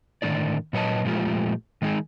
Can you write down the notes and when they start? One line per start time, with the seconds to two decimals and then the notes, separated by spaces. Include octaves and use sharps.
0.22 A2 D3 D#3 A#3 D#4 D5
0.73 A#2 F#3 B4 C#5 D#5 A5
1.05 A#2 F3 G#3 A3 F4 G4
1.82 D#3 G#3 D#4 G#4